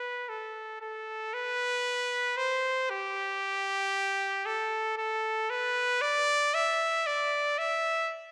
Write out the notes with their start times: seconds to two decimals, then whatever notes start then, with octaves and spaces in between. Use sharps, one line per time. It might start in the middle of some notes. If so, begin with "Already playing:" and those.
Already playing: B4
0.29 A4
0.81 A4
1.34 B4
2.37 C5
2.90 G4
4.46 A4
4.97 A4
5.50 B4
6.01 D5
6.54 E5
7.06 D5
7.58 E5